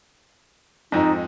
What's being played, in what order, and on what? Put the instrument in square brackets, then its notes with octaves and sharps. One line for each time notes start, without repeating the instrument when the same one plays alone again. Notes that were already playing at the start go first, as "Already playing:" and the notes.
[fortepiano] F2 G#2 [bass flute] D#4